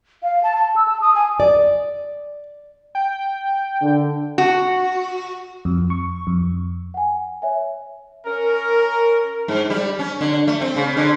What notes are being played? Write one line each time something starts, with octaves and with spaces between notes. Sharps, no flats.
F5
A5
A5
E6
A5
D#6
G#5
D5
G5
D3
F#4
F2
C#6
F2
F#5 G#5
C#5 E5 G#5
C#4 A#4
G#2
G3
C#4
D3
A3
C4
C#3
D3